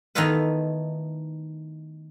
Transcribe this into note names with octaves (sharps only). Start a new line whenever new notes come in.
D#3 A3 B3 E4 F4 B4